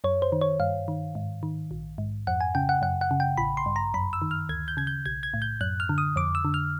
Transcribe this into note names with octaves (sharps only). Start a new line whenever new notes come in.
F#2 C#5
C5
D#3
C#5
G2 F5
D#3
G#2
D#3
A#1
G#2
F2 F#5
G#5
C#3 G5
F#5
F#2 F#5
F#5
C#3
G5
A1 B5
C6
G2
A#5
F#2 B5
E6
D#3
F6
D2 G#6
G6
C#3 G#6
G6
B1 G#6
G#6
A2
G6
F#2 F#6
F6
D3
D#6
F2 D6
E6
D3
F6